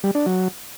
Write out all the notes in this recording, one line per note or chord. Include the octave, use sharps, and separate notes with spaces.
G3
D4
F#3